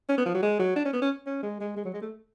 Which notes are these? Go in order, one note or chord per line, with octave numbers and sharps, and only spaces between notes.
C#4
B3
F3
F#3
G#3
F#3
D4
C#4
B3
C#4
C#4
G#3
G#3
G#3
F#3
G#3
A3